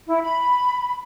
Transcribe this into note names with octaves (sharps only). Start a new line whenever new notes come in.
E4
B5